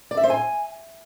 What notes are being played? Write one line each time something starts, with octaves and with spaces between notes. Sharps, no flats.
D5
E5
C5
G#5